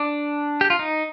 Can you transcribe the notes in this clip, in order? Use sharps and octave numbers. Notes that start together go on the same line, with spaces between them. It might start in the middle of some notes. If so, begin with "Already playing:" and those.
Already playing: D4
G4
F4
D#4